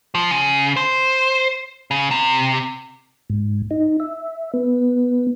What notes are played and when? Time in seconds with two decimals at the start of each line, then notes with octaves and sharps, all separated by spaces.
0.15 F3
0.31 C#3
0.77 C5
1.91 C#3
2.11 C3
3.30 G#2
3.71 D#4
4.00 E5
4.54 B3